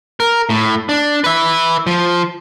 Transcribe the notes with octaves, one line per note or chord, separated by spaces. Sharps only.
A#4
A2
D4
B4 E5
F3